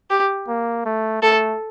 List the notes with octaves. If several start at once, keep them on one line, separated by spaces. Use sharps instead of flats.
G4
A#3
A3
A3 A4